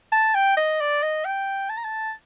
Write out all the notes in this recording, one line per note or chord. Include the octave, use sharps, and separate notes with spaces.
A5
G5
D#5
D5
D#5
G5
A5
A#5
A5